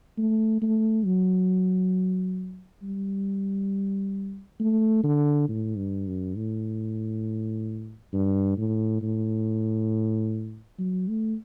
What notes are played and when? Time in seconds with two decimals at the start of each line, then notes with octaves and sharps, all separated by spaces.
0.18 A3
0.62 A3
1.05 F#3
2.83 G3
4.60 A3
5.04 D3
5.49 A2
5.77 G2
6.07 F#2
6.37 A2
8.13 G2
8.58 A2
9.02 A2
10.79 F#3
11.08 A3